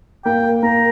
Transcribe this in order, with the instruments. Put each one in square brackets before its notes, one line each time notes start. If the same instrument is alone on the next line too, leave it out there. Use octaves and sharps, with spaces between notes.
[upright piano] A#3 [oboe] G5
[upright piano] A#3 [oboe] A#5